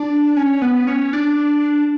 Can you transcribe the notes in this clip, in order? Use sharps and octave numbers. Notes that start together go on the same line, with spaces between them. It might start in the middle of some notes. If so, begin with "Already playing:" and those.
Already playing: D4
C#4
B3
C#4
D4